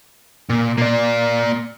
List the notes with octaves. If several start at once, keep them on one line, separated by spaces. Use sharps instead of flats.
A#2
A#2 A#3 D5